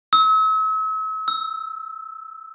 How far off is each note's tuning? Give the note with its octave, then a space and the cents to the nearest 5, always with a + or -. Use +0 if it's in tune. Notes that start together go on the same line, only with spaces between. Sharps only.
E6 -40
E6 +0